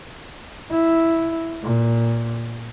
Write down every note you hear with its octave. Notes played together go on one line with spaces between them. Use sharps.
E4
A#2